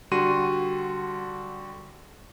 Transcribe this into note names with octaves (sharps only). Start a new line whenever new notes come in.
D3 G3 F#4 C6 D#7